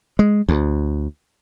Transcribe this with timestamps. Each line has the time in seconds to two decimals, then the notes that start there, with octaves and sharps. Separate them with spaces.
0.19 G#3
0.49 D2